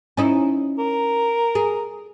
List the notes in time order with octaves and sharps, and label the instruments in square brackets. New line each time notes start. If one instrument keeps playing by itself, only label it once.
[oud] C#4 D#4 E4
[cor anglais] A#4
[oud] G#4